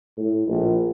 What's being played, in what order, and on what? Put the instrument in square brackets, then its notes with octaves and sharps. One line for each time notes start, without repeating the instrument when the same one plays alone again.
[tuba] A2
A#1